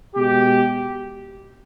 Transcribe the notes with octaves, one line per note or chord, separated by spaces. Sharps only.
B2 G#3 G4